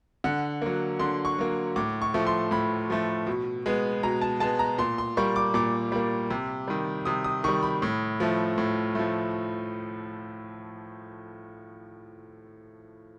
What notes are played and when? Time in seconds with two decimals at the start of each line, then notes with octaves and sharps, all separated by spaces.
0.24 D3 F#5
0.62 F#3 A#3
0.99 D3 C6
1.25 C#6
1.39 F#3 A#3
1.76 A2 D6
2.02 C#6
2.14 F3 A3
2.27 C6
2.51 A2 B5
2.90 F3 A3
3.27 B2
3.66 G#3 B3
4.03 B2 A#5
4.21 A5
4.40 G#3 B3 A5
4.59 A#5
4.78 A#2 C6
4.98 C6
5.17 G3 A#3 C#6
5.36 D6
5.54 A#2 D6
5.92 G3 A#3
6.30 C3
6.68 D#3 G3
7.05 C3 D#6
7.24 D#6
7.44 D#3 G3 C#6
7.63 B5
7.82 A2
8.20 F3 A3
8.58 A2
8.95 F3 A3